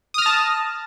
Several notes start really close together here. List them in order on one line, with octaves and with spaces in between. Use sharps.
D#6 F6 A#6 A5